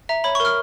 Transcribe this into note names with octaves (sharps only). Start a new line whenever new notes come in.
E5 A#5
C#5 B5
C#6
A#4 F6